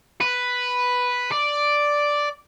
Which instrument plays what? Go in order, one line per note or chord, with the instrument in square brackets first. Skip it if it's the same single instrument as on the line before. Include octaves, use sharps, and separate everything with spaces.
[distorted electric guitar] B4
D5